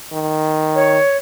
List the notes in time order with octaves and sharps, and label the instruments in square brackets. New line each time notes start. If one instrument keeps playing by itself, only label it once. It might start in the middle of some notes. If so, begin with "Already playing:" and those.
[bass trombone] D#3
[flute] C#5